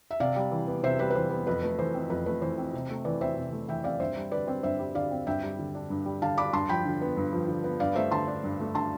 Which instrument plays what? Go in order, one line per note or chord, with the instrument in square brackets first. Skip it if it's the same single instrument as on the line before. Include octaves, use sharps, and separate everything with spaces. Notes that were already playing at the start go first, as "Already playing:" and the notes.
[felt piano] E5
C3 D5 F5
G3
E3
B3
C3 C5 E5
G3 B4
B4
E3 C5
B3
F2 B4
A3 B4
E3 C5
C4
F2 B4
A3 B4
E3 C5
C4
C3
A3
E3 B4 D5
C4 C5 E5
C3
A3
E3 E5 G5
C4 D5 F5
G2 C5 E5
G3
D3 B4 D5
C4 C5
G2 C5 E5
G3
D3 D5 F5
C4
G2 E5 G5
G3
D3
D4
G2
G3
D3 F5 A5
D4 B5 D6
G2 A5 C6
F3 G5 B5
D3
B3
G2
F3
D3
B3
G2 D5 F5
A3 C5 E5
D3 A5 C6
D4
G2
A3
D3 A5 C6